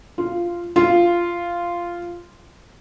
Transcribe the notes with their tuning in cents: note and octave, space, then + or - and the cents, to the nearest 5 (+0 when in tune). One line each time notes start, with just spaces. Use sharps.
F4 -10
F4 -10